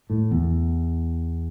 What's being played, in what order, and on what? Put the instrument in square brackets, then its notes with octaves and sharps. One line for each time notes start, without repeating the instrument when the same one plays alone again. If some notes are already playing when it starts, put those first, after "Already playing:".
[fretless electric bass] A2
E2